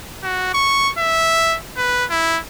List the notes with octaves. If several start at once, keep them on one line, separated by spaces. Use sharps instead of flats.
F#4
C#6
E5
B4
E4